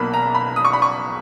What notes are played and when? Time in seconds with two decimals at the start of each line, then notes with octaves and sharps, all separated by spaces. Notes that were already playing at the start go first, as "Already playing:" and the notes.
Already playing: B1 B2 A#3 B5
0.14 A#5
0.35 B5
0.56 D#6
0.65 C#6
0.73 B5
0.82 C#6